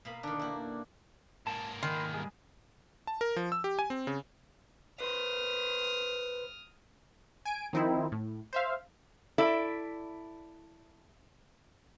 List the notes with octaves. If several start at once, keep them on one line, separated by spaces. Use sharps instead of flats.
B2 A#3 B5
D3 D#3 D4
A#3 E4 F#4 G5
G#2 A#3 A5
D#3 B5 C6
G3 G#3 G#4
A5
A#4
F3
E6
G4
G#5
C4
C#3
B4 C5 D#6 F6
G#5 D7
D#3 F3 C4 D#4 E4
A2
C5 E5 F5
E4 A4 D5 E5